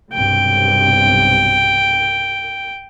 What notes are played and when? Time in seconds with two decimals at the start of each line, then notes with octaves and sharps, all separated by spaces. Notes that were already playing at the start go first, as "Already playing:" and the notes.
0.13 B1 G2 C3 G5